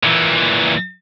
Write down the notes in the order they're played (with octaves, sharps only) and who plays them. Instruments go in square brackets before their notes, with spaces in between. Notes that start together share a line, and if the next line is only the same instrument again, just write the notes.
[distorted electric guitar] A#2 E3